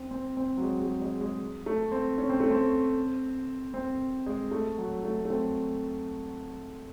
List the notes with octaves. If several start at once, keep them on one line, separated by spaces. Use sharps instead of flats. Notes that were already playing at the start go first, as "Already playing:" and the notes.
Already playing: C4
C4
C4
F#3
G#3
G#3
G#3
G#3
A3
C4
C#4
C4
A3
C4
C4
G#3
A3
F#3
A3
A3
C4